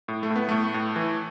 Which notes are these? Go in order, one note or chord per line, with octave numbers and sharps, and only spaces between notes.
A2
A3
A2
B3
A2 A3
A2
E3